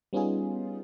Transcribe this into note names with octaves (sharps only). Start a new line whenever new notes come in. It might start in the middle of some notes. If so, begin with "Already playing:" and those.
G3 B3 C#4 D#4 F4 G#4